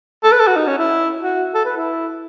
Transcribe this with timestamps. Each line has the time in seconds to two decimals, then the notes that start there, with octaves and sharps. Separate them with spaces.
0.23 A4
0.32 B4
0.40 A4
0.48 F#4
0.56 D#4
0.67 C#4
0.78 E4
1.22 F#4
1.54 A4
1.65 B4
1.76 E4